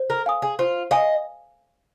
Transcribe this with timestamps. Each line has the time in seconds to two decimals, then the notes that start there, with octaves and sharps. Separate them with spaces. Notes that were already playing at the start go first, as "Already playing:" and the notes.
Already playing: C5
0.10 A#4
0.26 F5 G#5 D#6
0.42 G#4
0.59 F4 C5
0.91 D#5 F5 G#5 D#6